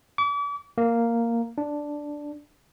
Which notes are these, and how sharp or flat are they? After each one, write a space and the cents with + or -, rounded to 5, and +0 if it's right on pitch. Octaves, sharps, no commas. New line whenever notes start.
D6 -40
A#3 -5
D4 +0